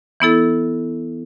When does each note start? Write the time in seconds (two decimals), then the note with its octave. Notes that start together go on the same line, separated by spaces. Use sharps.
0.20 E3 B3 E4 A4